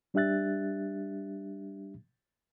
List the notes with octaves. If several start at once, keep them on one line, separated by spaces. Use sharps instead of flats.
G3 D4 G4 E5 F#6 A6